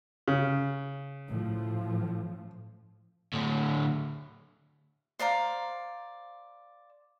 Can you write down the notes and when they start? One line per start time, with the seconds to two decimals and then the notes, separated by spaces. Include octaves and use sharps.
0.28 C#3
1.29 A2 F3
3.33 D2 A2
5.19 C5 D5 F5 A#5